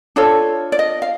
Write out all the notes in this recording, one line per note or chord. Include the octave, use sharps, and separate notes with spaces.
D4 F4 A4 C#5
D5
D#5
F5